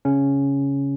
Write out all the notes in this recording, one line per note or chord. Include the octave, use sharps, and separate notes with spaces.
C#3 C#4